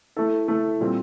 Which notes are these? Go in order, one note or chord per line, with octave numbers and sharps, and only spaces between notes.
A3 E4 A4
A3 E4 A4
A#2 G3 C4